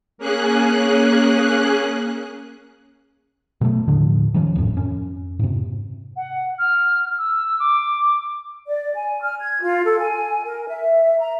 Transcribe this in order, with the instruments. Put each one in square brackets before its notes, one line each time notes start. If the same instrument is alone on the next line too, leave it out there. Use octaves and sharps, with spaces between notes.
[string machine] A#3 C#4 G#4 F#6
[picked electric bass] B2 F#3 A3
D#2 A2 D3 F3
D#3 F3 G3 C#4
D1 G1 F2 A2
F2 C#4
G#2 C3
[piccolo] F#5
F6
E6
D6
[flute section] D5
G#5
F6
G#6
F4
A4
G#5
A#4
E5
A#5